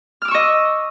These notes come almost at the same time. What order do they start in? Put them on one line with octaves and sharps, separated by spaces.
F6 D6 E6 C#6 D#5